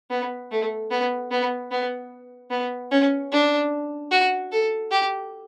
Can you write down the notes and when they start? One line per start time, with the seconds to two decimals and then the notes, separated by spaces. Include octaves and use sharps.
0.10 B3
0.51 A3
0.91 B3
1.31 B3
1.71 B3
2.50 B3
2.92 C#4
3.32 D4
4.11 F#4
4.52 A4
4.91 G4